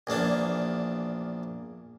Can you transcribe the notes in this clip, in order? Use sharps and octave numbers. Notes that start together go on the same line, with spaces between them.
A#1 E2 A#3 D4